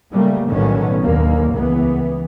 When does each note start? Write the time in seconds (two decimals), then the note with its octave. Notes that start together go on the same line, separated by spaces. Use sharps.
0.13 C#3 G3 A3 A#3
0.49 B1 A2 D3 D#3 B3 C#4
1.00 D#2 D3 A#3
1.54 C#2 E3 B3